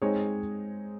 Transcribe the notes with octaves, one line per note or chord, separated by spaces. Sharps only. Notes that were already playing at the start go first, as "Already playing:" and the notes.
G#3 C4 D#4 G#4 C#5